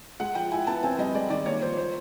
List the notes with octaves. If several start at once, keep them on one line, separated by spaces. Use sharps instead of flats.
G#3 F#5
F3 G5
E4 G#5
B3 A5
C4 G#5
G3 D#5
G#3 D5
D#3 D5
A#3 C#5
F3 C5
C5